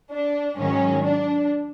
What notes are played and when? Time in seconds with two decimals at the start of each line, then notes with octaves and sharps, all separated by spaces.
0.11 D4
0.58 G#2 D#3 F#3 C#4
1.04 D4